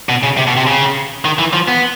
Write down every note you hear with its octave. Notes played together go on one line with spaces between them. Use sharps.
B2
C#3
C3
B2
C3
C#3
D#3
E3
F3
B3